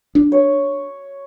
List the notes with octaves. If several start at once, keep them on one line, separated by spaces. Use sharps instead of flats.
D4
C#5